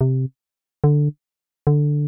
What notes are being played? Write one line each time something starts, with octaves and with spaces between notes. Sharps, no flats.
C3
D3
D3